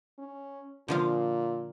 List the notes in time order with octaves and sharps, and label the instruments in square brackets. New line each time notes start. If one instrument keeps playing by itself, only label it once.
[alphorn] C#4
[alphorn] A#2 [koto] D3 F3 F5